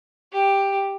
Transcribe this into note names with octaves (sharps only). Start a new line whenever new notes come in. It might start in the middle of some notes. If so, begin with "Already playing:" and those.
G4